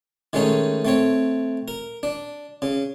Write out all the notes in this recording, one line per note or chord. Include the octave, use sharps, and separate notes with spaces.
D#3 G#3 A3 C#4 D#4
A3 C4 C#5
A#4
D4
C#3